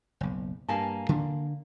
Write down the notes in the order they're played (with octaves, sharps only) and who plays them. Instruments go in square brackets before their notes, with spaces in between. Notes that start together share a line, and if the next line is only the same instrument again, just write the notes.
[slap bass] F#1 B1
[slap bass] G2 [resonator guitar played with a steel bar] A#3 G#5 A5
[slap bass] D3 D4